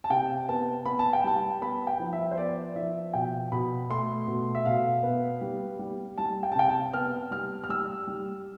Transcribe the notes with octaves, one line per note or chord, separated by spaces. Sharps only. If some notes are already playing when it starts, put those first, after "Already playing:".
A5
C3 G5
B3 A5
B3 B5
A5
G5
G3 A5
B3 B5
G5
F3
E5
C5
B3 D5
F3 E5
B2 G5
B2 B5
A3 C6
B2
E5
B2 F5
B3
G3
G3
G3 A5
G5
A5
C3 G5
A5
B3 F6
G3 F6
F6
G3 E6
G3